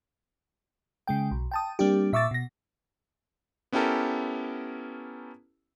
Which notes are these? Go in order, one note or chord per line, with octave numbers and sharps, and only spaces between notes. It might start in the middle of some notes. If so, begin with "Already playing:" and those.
C#3 G#3 G5
B1
G5 A5 D#6
G3 A#3 C4 D4 G4
A#2 E5 C#6 D6 E6 A6
B2 A#6
B3 C#4 E4 G4 A4 A#4